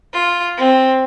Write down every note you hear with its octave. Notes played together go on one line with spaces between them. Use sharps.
F4
C4